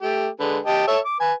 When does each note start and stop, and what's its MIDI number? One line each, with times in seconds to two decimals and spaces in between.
0.02 0.28 57
0.02 0.28 67
0.40 0.58 50
0.40 0.58 56
0.40 0.58 71
0.66 0.85 67
0.66 0.85 75
0.66 0.85 81
0.87 0.99 69
0.87 0.99 73
0.87 0.99 76
1.05 1.18 86
1.20 1.33 71
1.20 1.33 80